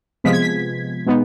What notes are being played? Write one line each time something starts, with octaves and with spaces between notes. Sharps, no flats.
C3 F3 G#3 B3 B6
G#6
B6
B2 G#3 B3 D#4